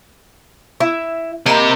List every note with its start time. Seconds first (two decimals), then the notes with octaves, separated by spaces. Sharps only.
0.80 E4 E5
1.46 C3 A#3 G4 A#4 D#5 A#5 B5